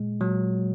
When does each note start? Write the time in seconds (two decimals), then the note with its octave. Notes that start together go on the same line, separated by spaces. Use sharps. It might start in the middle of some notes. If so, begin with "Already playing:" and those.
Already playing: A#2 G#3
0.21 A#2 F#3